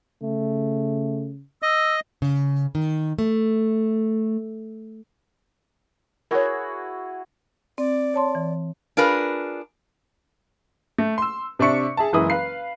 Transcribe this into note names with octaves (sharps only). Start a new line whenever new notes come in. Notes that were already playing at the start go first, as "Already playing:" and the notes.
C#3 A3
D#5 E6
C#3
D#3
A3
E4 F#4 G#4 A#4 C#5
C4 D5
C#5 A5 C6
E3
D4 F4 G#4 A#4 B4
A3
C6 E6
C3 D4 E5 C#6 C#7
G#4 E5 A5
F#1 E3 G#3 E4 G#4 D#6
B4 F5 C7